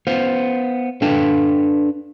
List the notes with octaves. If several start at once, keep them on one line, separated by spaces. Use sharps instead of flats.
B3 C5 F5
D4 A4 B4 F5 G5 A5